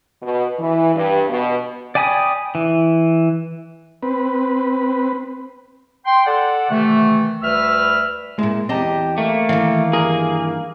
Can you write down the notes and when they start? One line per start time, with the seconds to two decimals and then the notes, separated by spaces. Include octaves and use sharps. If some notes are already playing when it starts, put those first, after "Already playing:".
0.23 B2
0.59 E3
0.95 G2
1.29 B2
1.95 D5 G5 G#5 B5 D#6
2.55 E3
4.03 C4 B4
6.06 G5 C6
6.26 A4 D5 F#5
6.70 C3 D#3 E3 A3
7.43 D2 G3 B4 E5 E6 F6
8.39 A#2 G#3 E4
8.69 E2 C4 G4 D#5 A5 A#5
9.18 A3 A#3
9.49 D#3 E3 F5
9.93 G2 G#4 A#4